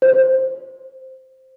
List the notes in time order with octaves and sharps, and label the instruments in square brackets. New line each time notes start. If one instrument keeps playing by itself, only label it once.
[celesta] C5